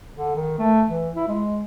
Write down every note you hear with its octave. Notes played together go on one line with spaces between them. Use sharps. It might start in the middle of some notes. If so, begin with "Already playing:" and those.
D3
D#3
A3
E3
E4
G#3